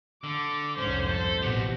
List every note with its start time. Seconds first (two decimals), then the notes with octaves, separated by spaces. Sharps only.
0.24 D3 D6
0.78 C2 F2 G#2 C#4 C5
1.09 A4
1.42 A1 B2 G4 F#5